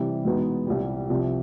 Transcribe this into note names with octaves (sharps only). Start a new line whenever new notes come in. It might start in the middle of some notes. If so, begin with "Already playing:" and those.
Already playing: C3 E3 G3
E2 B2 G#3 B3 D#4
C2 A#2 G3
C2 C3 F3